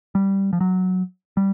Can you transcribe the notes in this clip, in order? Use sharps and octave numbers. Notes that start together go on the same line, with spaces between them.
G3
F3
F#3
G3